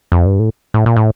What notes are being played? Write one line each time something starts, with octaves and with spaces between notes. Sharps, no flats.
F2
G2
A2
A2
A#2
A2